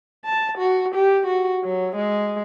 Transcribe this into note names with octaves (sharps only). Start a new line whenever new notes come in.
A5
F#4
G4
F#4
F#3
G#3